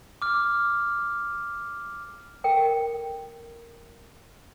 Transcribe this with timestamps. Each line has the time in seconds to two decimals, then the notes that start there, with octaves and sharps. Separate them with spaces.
0.22 D6 F6
2.44 A4 A#4 G5